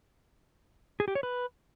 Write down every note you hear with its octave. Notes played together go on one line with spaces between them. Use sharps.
G#4
G4
C#5
B4